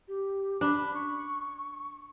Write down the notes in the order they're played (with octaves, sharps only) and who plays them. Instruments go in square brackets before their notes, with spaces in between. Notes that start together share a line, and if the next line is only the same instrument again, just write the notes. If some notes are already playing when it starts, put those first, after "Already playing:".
[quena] G4
[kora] D4 [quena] B5
[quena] C#6